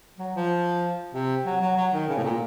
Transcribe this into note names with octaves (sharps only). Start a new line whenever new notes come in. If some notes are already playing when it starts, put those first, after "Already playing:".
F#3
F3
C3
F#3
F#3
F#3
D#3
C#3
A2
A#2